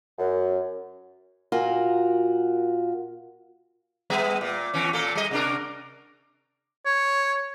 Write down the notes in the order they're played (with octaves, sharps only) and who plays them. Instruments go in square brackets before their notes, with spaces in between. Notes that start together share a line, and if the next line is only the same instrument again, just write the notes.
[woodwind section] F#2
[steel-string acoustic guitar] A#2 F4 F#4 A#4
[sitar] G3 B3 E5
A#2
E2 E3 C#4
A#2 A#3 A4
G3 D#5
C3 D4 A#4
[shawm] C#5